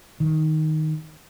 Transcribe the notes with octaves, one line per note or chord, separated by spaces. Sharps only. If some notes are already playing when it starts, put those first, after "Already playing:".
D#3